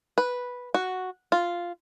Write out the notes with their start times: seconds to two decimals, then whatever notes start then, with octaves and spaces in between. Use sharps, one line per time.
0.18 B4
0.74 F#4
1.32 F4